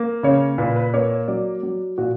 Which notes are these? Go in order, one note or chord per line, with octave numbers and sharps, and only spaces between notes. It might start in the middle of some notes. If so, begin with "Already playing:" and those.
Already playing: A#3
C#3 C#5
A#2 B4
B4
A#3 C#5
C#5
F#3 D5
F#3
A#2 F#4